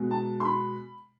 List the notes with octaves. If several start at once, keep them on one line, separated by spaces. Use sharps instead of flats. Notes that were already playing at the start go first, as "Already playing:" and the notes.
Already playing: B2 G#3 B3
A5
C6
B5